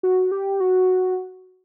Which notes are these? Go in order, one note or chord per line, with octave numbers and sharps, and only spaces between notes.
F#4
G4
F#4